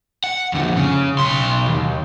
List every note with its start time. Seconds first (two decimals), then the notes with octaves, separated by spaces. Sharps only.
0.24 F#5
0.53 F2 D3
0.76 C#3
1.18 B1 C6
1.68 D#2